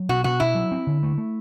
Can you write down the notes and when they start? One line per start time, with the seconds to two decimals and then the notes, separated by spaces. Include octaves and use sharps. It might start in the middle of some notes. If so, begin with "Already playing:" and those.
Already playing: F#3
0.09 B2 F#4
0.24 B2 F#4
0.40 B2 E4
0.55 F#3
0.72 C4
0.87 D3
1.03 A3
1.18 A3